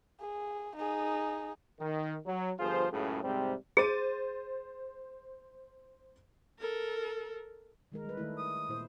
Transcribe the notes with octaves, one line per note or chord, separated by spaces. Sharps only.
G#4
D#4 G#4
D#3
F#3
G1 F3 F4 G#4 C5
C#2 F#2 A2 C#3
G#2 C3 G3 C4
G#4 C5 A6 D#7
A4 A#4
D#3 G#3 A#4
G3 B4
D#3 A3 E4
D#6
A#2 E4 C5